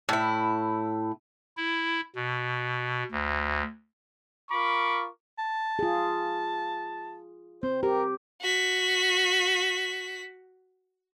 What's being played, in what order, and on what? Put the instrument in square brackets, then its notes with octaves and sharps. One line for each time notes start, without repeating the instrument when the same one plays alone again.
[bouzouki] A2 E4
[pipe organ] E4
B2
D2
[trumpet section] F4 A#4 B5 C#6 D6
[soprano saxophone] A5
[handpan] F4 G#4
[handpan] C4 [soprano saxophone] C5
[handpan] G4 [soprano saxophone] A#4
[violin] F#4 B6